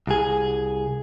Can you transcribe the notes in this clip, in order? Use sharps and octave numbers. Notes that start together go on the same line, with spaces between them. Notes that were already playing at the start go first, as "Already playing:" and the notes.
C2 G#4